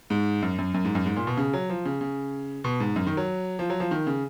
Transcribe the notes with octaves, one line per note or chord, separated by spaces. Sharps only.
G#2
F#2
F#2
F#2
G#2
F#2
G#2
A#2
B2
C#3
F#3
F3
C#3
C#3
B2
G#2
F#2
D#3
F#3
F3
F#3
F3
D#3
C#3